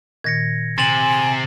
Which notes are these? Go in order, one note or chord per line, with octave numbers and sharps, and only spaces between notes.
A#2 D#3 G#6 A#6 C#7
C3 G#5 A6 E7 F#7